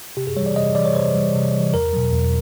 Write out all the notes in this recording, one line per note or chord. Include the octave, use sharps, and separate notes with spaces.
C3 G4
G#4
E3 G3 C#5
D5
C3 D#5
E3 G3 D5
C#5
C3 C5
E3 G3
C3
E3 G3
E2 A#4
B2 F#3
E2